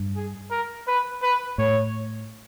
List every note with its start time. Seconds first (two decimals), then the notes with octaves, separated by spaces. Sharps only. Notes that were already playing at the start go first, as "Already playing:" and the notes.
Already playing: G2
0.16 G#4
0.51 A#4
0.87 B4
1.23 B4
1.58 A2 C#5